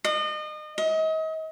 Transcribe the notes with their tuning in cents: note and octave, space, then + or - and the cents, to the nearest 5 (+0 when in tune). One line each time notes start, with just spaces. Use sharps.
D#5 -35
D#5 +35